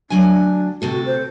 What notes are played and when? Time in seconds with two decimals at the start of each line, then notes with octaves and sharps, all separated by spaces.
0.10 D2 F#3 D4 G#5
0.82 D2 C3 F#4 A4
1.06 C5